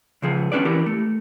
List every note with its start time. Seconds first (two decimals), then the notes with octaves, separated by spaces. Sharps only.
0.22 C#3 F3 G#4
0.52 D#2 F3 C#4 D4 B4 D5
0.65 E3 G4 A#4
0.86 A3